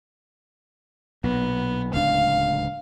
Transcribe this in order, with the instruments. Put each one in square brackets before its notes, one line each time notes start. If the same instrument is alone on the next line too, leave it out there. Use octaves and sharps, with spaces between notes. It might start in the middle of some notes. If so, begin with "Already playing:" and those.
[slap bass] B1 A#2 [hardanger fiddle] B3
[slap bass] D1 C#2 D4 [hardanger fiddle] F5